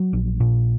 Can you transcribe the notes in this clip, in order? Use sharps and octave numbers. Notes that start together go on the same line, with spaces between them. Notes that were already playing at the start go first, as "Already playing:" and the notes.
Already playing: F#3
A#1
A#2